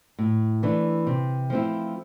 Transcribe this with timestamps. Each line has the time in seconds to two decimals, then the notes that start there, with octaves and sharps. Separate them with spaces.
0.19 A2
0.63 E3 A3 D4
1.07 C3
1.50 F3 A3 C4 E4